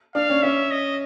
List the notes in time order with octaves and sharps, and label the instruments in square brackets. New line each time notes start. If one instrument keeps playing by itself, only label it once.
[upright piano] D4 [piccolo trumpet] F5
[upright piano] C#4
[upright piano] C#4 [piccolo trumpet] E5
[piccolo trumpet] D#5